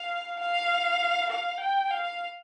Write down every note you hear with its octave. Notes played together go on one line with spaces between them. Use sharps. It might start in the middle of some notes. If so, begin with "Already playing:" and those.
Already playing: F5
F5
F5
G5
F5